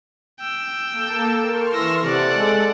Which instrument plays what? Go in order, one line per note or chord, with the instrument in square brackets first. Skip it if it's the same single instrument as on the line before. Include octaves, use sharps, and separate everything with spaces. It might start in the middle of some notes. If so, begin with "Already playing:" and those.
[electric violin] G5 E6
[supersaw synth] A#3 A4 A5
[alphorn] A#4 [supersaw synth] C6 C#6 F6
[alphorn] E3 [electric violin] E6 A#6
[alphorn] C3 [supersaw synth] A4 [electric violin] D5 F#5
[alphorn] G#3